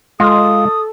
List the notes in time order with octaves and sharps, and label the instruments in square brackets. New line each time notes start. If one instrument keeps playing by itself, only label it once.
[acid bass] G#3 [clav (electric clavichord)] F4 [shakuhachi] A4 [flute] D#6